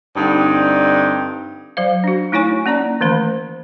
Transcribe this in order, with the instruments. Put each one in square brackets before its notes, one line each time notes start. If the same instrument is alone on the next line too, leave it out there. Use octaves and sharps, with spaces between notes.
[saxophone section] G2 D3 C4 D#4 D5
[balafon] F#3 C5 F5
D4 F#4
A3 D#4 E4 C#5 G#5 C#6
A#3 C#4 D5 A#5
D#3 E3 A3 C5 B5